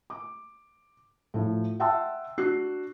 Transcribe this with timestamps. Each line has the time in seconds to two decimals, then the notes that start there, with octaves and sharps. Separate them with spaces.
0.10 D6
1.34 A2 F3
1.80 E5 F#5 G5 A5 C6 E6
2.38 D4 F#4 F#6 C7